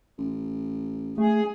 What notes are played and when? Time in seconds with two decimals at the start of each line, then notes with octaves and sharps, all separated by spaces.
0.18 A1
1.18 A3 G#4